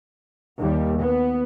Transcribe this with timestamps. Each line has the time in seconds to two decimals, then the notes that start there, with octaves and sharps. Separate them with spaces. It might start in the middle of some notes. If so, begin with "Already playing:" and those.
0.59 D#2 G3
0.98 B3